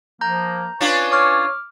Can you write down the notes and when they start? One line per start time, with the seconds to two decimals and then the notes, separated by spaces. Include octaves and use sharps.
0.21 F3 A#3 A#5 G6
0.81 C#4 D4 F4 B4 G#5 C#6
1.12 C#5 D6 F6